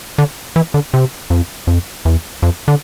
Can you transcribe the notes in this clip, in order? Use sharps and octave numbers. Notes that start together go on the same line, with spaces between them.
D3
E3
D3
C3
F2
F2
E2
F2
D3